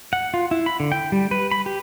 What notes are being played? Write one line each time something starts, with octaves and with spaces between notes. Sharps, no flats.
F#5
F4
E4
B5
D3
G5
G3
B4
B5
G4